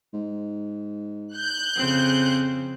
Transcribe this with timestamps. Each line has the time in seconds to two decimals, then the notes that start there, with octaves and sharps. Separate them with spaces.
0.13 G#2
1.34 F#6 G6
1.77 F2 C#3 C4